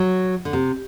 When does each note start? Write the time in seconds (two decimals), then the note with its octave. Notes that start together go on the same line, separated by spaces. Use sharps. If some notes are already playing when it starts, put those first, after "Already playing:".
Already playing: F#3
0.45 D3
0.53 C3